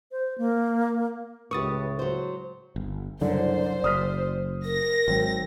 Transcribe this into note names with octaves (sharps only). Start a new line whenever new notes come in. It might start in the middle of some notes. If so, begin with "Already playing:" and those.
C5
A#3
C#2 A2 G4 B4 C#6 D#6 A6
F#3 C5
G1
F#1 C2 F#2 D3 C5 D5
F#1 D#6 F6 B6
A#4 A#6
G#1 F#3 C4